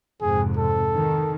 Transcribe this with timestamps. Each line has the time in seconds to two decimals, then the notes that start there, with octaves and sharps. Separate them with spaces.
0.21 F2 G#2 C3 G#4
0.57 A4
0.93 D#3